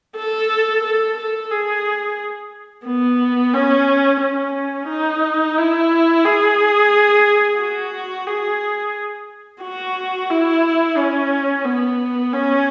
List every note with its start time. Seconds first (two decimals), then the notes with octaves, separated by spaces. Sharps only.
0.16 A4
0.84 A4
1.17 A4
1.51 G#4
2.86 B3
3.54 C#4
4.21 C#4
4.89 D#4
5.57 E4
6.24 G#4
7.59 F#4
8.27 G#4
9.62 F#4
10.30 E4
10.97 C#4
11.65 B3
12.33 C#4